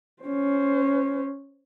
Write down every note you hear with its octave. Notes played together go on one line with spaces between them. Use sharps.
C#4 C5